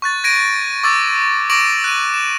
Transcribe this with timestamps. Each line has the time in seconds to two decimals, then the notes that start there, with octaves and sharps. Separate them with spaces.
0.02 C#6 F#6 A6
0.24 G#6 A#6 D7 D#7
0.83 C#6 D6 E6 A6
1.50 C#6 D6 A#6 D7 E7 F#7
1.84 F#6 D#7
2.14 E7